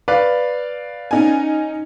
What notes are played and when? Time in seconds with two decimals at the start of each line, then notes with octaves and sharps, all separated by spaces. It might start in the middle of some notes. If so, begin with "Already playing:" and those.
0.08 B4 D5 F5
1.11 C#4 D#4 G#5